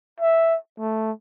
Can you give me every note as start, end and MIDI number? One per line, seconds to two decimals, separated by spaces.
0.20 0.56 76
0.80 1.12 57